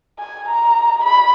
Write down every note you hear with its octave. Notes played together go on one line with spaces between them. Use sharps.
G#5
A#5
B5